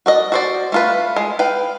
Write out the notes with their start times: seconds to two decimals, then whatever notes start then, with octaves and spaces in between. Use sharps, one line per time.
0.06 F#4 D5 D#5
0.32 F#4 C5 D5
0.72 A3 F4 B4
1.16 G#3
1.39 B4 F5 G5